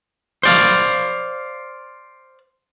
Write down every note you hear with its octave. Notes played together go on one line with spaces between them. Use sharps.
C5 D5 F5